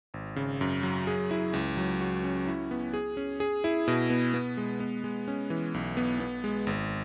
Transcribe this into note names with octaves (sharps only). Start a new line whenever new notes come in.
G#1
C#3
F#2
F#3
G#4
E4
C#2
F#3
F#4
C#4
E4
B3
G#4
C#4
G#4
E4
B2
B3
B3
G#3
B3
G#3
C#4
E3
B1
B3
B3
G#3
G#1